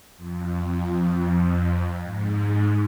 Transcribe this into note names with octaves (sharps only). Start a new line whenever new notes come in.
F2
G#2